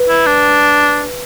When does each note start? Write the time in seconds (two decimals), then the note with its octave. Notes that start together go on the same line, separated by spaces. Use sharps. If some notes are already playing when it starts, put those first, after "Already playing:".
Already playing: B4
0.09 E4
0.26 D4